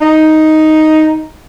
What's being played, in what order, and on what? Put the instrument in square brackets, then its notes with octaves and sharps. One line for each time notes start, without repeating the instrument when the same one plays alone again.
[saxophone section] D#4